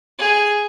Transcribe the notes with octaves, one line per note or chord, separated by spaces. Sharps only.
G#4